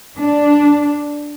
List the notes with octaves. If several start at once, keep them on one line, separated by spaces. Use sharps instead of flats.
D4